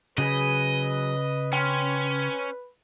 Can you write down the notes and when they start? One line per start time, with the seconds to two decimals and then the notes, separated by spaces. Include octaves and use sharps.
0.18 C#3 F#3 G#4 B4 D#5 B5
1.53 C#4 G5 C6 F6